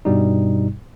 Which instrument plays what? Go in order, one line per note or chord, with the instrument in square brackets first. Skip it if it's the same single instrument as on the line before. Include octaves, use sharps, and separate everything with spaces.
[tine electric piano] G2 B2 G3 D#4